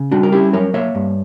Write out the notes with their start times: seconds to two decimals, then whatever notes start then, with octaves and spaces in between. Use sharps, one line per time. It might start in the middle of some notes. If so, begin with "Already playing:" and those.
Already playing: C#3
0.11 G3 D4 F#4
0.23 A#4
0.32 C#4 E4 G4
0.53 F#3 A#4 C#5
0.74 A#3 C#5 E5
0.95 G2